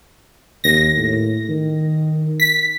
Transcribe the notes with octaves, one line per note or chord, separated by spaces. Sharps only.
D#2 A#6
A2
D#3
B6